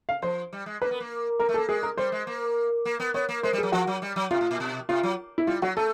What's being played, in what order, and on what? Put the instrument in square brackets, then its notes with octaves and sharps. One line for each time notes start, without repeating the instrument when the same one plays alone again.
[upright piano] F5
[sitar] F3 [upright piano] C5
[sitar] G3
G#3
[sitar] A#3 [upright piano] B4
[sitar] B3
A#3
[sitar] A#3 [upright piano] A#4
[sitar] A3
[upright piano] A4
[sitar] A#3
[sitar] G#3 [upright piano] G#4
[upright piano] A#4
[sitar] G3 [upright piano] C5
[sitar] G#3
A#3
A#3
B3
[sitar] B3 [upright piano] C#5
[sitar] A#3
[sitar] G#3 [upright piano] C5
[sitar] G3
[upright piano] G#4
[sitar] F#3
[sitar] F3 [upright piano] F#4
[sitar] F#3
G3
F#3
[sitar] C3 [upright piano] F4
[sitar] A2
A#2
B2
[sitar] C3 [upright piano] F4
[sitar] F#3
[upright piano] E4
[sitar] G3 [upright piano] F4
[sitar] F#3 [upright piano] F#4
[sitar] A3 [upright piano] A4